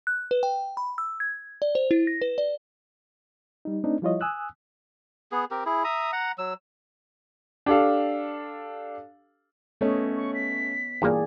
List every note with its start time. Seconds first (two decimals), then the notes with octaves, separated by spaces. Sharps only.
0.07 F#6
0.31 B4
0.43 G5
0.77 B5
0.98 E6
1.20 G#6
1.62 D5
1.75 C5
1.91 E4
2.07 A#6
2.22 B4
2.38 D5
3.65 G3 D#4
3.84 A3 C4 D4 D#4
4.02 F3 G3 E4 F4 C#5 D#5
4.21 G#5 D#6 E6 F#6
5.32 B3 G#4
5.51 C4 G4 A#4
5.66 E4 G#4
5.84 E5 A#5 D#6
6.12 F#5 A#5
6.38 F#3 E6
7.66 D4 G4 A4 F5
9.81 A3 B3 C#4 C#5 D#5
10.16 C#6
10.34 B6
11.02 G2 A#2 E3 A#3 G#4 D5